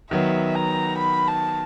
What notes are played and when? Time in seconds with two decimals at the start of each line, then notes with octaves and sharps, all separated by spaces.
0.11 D#3 F#3 B3 E5
0.55 A#5
0.98 B5
1.28 A5